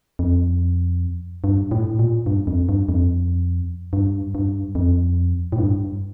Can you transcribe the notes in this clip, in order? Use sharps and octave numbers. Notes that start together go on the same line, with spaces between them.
F2
G2
A2
A#2
G2
F2
G2
F2
G2
G2
F2
A2
G2